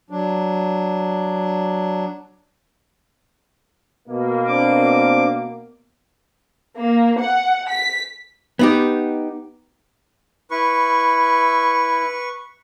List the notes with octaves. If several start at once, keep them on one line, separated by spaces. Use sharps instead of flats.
F#3 D4
B2 A#3
C4 D4 D6
A#3
F#5
B6
B3 D#4 G4
E4 B4 C#6